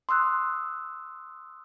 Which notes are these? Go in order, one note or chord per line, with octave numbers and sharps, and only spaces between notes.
C6 D#6 E6 F#6